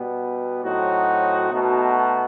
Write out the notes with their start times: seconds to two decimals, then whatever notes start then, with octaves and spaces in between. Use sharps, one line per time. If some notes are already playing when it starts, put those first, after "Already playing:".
Already playing: B2 G3 B3
0.63 A2 F#3 C4 D#4 F#4
1.52 B2 A3 D#4 F#4